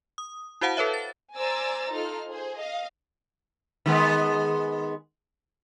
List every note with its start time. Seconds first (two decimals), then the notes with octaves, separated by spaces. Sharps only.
0.18 D#6
0.61 E4 F#4 C5 F5 F#5 A5
0.77 A4 B4 C#5 E5
0.94 A6
1.37 C5 D5 G#5 A#5 E6 A6
1.91 D#4 F4 A4 F6
2.29 G#4 C5
2.58 D#5 F5
3.86 D#3 G#3 B3